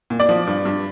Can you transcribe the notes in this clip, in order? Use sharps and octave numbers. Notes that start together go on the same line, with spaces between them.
A#2
D5
F3
G2
G2